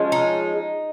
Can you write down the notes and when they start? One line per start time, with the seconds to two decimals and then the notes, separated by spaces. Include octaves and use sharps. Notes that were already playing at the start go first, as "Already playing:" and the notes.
Already playing: F3 G#3 C#4
0.12 D#4